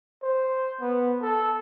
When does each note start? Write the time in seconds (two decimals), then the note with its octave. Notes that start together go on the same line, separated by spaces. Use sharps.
0.23 C5
0.81 B3
1.22 A4